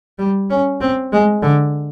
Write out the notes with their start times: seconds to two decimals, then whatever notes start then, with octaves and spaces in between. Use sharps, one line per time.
0.19 G3
0.50 C#4
0.81 C4
1.12 G#3
1.42 D3